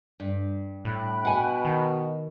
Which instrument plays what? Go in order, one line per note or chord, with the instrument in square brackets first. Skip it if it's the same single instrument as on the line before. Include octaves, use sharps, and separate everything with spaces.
[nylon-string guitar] G2
[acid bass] A2 [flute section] G5 B5 F#6
[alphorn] B2 [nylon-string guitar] F#5 G#5
[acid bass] D#3